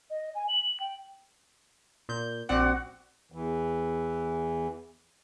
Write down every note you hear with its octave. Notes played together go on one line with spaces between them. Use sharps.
D#5
G#5
F#7
G5
A#2 G6
A#1 C4 F#4 D5 F#5
E2 E3